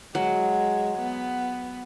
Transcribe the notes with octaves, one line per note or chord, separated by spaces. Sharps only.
F#3 G#3
B3